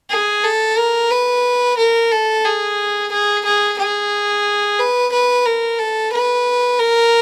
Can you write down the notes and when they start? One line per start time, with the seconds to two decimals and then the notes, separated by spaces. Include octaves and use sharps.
0.11 G#4
0.45 A4
0.78 A#4
1.11 B4
1.78 A#4
2.12 A4
2.45 G#4
3.12 G#4
3.45 G#4
3.79 G#4
4.79 B4
5.13 B4
5.46 A#4
5.79 A4
6.13 B4
6.79 A#4